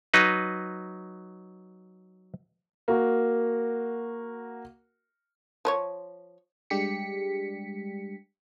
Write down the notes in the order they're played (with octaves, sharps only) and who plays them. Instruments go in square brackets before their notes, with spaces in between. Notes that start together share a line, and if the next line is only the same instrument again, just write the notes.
[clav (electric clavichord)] F#3 D#4 B4
[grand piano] A#3 F#4 A#4
[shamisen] F3 B4 C#5
[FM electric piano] G3 G#3 D4 G4 B6 C#7